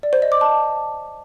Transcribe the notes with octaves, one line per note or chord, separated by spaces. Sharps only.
D5
C5
D#5
D6
A5